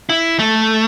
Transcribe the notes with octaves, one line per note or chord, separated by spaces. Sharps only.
E4
A3